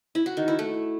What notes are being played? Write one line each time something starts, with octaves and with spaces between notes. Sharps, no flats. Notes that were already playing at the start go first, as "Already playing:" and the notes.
E4
F#4
D#3
E4
A3